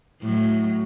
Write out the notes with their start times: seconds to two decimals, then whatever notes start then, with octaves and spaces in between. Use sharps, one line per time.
0.21 A2 F#3